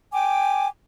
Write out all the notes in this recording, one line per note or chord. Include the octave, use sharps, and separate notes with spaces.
G5 G#5 D6